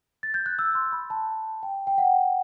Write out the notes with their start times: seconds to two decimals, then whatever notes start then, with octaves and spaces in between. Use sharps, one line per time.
0.23 A6
0.34 G6
0.46 F#6
0.59 E6
0.75 C6
0.92 B5
1.10 A5
1.63 G5
1.87 G5
1.98 F#5